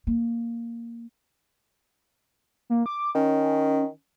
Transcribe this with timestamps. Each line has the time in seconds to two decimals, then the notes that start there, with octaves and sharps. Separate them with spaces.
0.07 A#3
2.70 A#3
2.86 D6
3.15 D#3 C#4